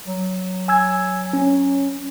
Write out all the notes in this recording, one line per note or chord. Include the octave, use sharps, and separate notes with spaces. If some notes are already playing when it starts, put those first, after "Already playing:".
F#3
G#5 E6 G#6
C#4